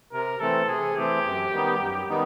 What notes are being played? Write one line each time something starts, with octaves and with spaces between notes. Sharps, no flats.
C3 A#4
E3 A3 C4 A4
C3 G#4
E3 A3 C4 G4
F#2
D#3 G3 B3 D#4
F#2
D#3 G3 B3 D#4